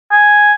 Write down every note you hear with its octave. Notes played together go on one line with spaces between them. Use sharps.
G#5